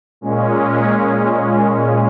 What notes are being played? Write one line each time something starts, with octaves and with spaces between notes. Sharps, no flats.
A#2 G#3 C#4